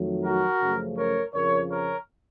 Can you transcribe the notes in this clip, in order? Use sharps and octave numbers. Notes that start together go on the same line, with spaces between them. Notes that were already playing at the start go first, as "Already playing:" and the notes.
Already playing: F2 D#3 F#3 A3
F#4 A#4
F#2 C#3 F3 A3
A#4 C#5
F2 C#3 F3 A#4 C#5
A#4 C#5